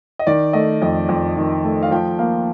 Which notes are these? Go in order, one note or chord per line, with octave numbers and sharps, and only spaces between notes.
D#5
D#3 D5
A3 D#5
F2 D#5
F2
D#3
A3
F5
F3 G5
A#3 F5